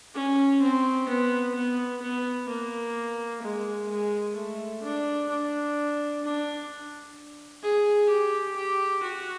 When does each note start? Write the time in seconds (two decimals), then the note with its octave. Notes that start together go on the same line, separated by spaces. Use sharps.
0.15 C#4
0.62 C4
1.08 B3
1.55 B3
2.02 B3
2.49 A#3
3.42 G#3
3.89 G#3
4.35 A3
4.82 D4
5.29 D4
6.23 D4
7.63 G#4
8.09 G4
8.56 G4
9.03 F#4